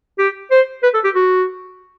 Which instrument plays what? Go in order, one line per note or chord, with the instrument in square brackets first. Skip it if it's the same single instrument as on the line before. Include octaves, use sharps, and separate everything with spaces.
[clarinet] G4
C5
B4
A4
G4
F#4